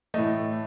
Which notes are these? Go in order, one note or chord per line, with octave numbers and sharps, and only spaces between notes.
A2 E3 A3 D#5